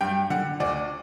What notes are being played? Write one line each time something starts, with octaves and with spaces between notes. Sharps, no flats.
G2 G5
D3 F#5
D2 D5